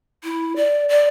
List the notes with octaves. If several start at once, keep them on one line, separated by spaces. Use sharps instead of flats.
E4
D5
D5